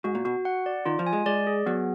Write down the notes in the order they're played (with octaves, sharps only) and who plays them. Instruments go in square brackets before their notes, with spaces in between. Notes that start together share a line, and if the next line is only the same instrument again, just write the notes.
[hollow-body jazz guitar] G#2 [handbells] F#4
[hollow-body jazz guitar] A#2
[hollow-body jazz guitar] B2 [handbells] F#4
[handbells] F#5
D5
[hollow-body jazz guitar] D#3 [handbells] F4
[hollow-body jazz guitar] F3
[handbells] G#5
[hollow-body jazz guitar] G#3
[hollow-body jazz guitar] G#3 [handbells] D5
[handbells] G#4
[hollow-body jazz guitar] F#3 [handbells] B3